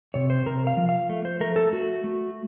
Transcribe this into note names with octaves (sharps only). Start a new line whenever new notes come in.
C3 C#5
C5
C3 A#4
F5
F3
F5
A3
C5
A3 A#4
A4
A3 F#4
A3